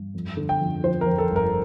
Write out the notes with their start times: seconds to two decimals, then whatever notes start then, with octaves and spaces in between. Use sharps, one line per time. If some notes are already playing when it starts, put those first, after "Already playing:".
Already playing: G2
0.14 F2
0.37 D3
0.49 G5
0.61 F2
0.84 F3 C5
1.01 A#4
1.06 F2
1.18 A4
1.30 G1
1.36 A#4